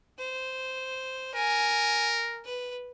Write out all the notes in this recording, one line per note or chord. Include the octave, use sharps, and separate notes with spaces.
C5
A#4 G#5
B4